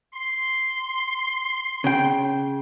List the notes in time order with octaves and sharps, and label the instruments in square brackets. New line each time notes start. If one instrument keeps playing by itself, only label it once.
[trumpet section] C6
[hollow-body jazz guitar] C#3 G5